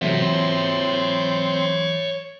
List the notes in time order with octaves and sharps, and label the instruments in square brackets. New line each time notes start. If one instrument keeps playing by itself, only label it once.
[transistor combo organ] C3 [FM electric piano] E3 F#3 A3 [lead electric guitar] C#5 E5
[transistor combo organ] C4